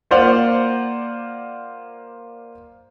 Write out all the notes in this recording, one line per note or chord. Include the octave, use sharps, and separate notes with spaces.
A#3 F4 C5 D5 F5 F#5